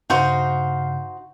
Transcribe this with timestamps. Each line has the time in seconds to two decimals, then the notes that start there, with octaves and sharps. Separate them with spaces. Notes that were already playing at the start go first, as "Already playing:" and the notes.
0.10 G2 C#3 D#4 F#4 C5 F5 G6